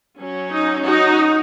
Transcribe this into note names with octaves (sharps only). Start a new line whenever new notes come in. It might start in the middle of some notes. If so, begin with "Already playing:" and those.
F#3 C#4
D#4
D#4 F#4